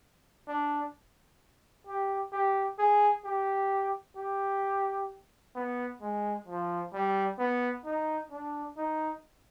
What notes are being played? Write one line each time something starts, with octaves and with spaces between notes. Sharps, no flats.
D4
G4
G4
G#4
G4
G4
B3
G#3
F3
G3
B3
D#4
D4
D#4